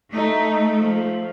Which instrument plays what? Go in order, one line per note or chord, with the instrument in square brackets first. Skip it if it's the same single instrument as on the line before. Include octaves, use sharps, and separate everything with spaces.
[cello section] A3 [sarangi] D#4
[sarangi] F3